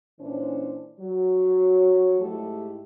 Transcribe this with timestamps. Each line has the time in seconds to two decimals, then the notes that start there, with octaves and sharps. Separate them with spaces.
0.20 A#2 E3 C#4 D4 C5
1.00 F#3
2.21 G#2 A3 E4 G4 A4